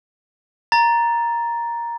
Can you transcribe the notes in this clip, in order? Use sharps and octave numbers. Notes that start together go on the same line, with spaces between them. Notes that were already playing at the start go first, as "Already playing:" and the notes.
A#5 A6